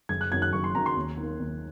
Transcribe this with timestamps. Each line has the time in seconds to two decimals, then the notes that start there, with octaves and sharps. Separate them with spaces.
0.09 F#1 G#6
0.21 F#6
0.31 F#2 D#3 F#3 G#6
0.42 F#6
0.53 F#1 C#6
0.64 C6
0.75 F#2 D#3 F#3 A#5
0.86 C6
0.97 D#2
1.17 D#3
1.23 A#3
1.40 D#2